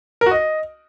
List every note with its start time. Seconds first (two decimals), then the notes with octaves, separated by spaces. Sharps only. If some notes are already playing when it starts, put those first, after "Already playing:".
0.21 A#4
0.26 F#4
0.31 D#5